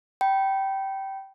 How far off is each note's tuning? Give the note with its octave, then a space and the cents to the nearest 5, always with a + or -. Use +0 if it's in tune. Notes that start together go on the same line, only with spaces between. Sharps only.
G5 -20 B5 -10